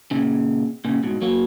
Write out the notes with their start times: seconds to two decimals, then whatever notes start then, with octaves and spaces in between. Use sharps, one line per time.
0.11 A#2 C#3
0.85 A#2 C#3
1.03 G#2 B2
1.22 F#3 A#3